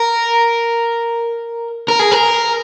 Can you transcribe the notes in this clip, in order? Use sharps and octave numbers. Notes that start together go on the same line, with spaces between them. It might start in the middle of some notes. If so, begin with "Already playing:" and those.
Already playing: A#4
A#4
G#4
A#4